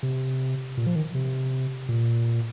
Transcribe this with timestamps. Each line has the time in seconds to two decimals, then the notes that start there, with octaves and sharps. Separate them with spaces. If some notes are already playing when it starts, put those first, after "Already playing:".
0.03 C3
0.77 A#2
0.87 F3
0.96 D#3
1.15 C3
1.89 A#2